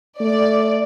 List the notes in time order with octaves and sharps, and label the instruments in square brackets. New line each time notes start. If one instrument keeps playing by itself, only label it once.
[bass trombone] A3 [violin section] D5